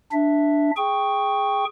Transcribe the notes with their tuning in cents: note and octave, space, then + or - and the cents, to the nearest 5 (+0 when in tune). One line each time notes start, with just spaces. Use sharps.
D4 +0 E5 +0
G#4 +0 G5 +10 C#6 +0